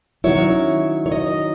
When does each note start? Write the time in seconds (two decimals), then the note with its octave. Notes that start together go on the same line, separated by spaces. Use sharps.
0.24 D#3 F#3 C#4 E4 C#5
1.06 C#5
1.12 D#5